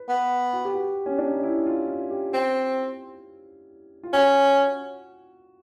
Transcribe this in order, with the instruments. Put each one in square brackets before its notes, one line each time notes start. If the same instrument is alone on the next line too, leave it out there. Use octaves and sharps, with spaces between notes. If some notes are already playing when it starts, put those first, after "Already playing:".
Already playing: [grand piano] B4
[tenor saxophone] B3
[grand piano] F#4
G4
F#4
C#4
D4
D#4
E4
F4
F4
G4
[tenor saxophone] C4
[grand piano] F4
[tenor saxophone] C#4 [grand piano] F#4